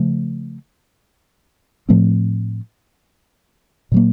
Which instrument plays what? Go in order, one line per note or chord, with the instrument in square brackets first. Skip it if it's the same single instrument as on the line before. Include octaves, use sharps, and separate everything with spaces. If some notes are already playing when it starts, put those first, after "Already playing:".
Already playing: [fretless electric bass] C#3 F3 A3
A2 F3 A3 C4
A#2 F#3 A#3